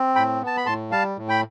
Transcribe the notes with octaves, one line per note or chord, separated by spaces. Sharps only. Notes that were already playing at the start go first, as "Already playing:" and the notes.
Already playing: C4
A2 G5 B5
B3
A5
B5
A2 A5 C6
G3 F5 A5
A2
G5 B5